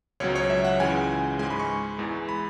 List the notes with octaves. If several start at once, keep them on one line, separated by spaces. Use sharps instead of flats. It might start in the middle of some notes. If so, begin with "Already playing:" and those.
C#2 B2 F#3 C#5
C#5
E5
F#5
C#2 C#3 E3 G#3 G#5
G#2 G#3 G#5
B5
C#6
E2 E3 G#3
B5